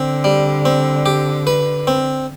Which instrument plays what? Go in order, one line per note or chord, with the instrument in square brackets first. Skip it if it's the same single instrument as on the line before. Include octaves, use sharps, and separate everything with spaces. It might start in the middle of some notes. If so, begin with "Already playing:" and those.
Already playing: [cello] D3 [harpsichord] C4
[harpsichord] G3
C4
G4
B4
C4